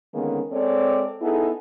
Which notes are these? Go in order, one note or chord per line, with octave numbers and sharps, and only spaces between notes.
D3 D#3 G#3 A#3 B3 C#4
G#3 C4 A4 C#5 D5
B3 D#4 E4 G#4 A4